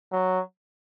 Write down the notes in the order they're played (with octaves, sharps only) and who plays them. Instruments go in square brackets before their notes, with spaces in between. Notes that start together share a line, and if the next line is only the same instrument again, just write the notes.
[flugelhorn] F#3